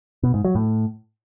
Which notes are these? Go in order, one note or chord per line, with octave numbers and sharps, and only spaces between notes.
B2
G#2
F#3
A2